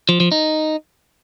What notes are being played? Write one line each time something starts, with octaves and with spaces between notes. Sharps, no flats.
F3
F3
D#4